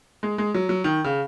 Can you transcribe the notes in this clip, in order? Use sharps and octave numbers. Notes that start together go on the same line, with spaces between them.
G#3
G#3
F#3
F#3
D#3
C#3